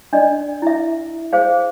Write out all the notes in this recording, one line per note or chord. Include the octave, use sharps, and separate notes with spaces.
D4 D5 D#5
E4 E5
G#4 C5 F5